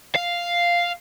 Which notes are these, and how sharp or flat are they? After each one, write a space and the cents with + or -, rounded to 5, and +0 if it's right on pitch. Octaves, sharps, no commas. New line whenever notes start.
F5 -5